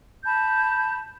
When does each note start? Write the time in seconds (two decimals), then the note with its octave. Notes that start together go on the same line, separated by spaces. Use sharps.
0.24 A5 B5 G6